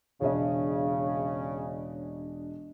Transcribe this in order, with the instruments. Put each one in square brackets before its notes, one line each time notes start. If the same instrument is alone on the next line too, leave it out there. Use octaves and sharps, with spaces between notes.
[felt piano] E1 D4 D#5 [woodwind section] C#3